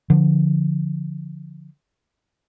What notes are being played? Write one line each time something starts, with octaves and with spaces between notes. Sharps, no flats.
D3 F3